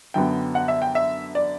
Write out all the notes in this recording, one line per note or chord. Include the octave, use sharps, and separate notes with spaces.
F#2 D3 F#3 B3 G5
F#5
E5
G5
E5
D5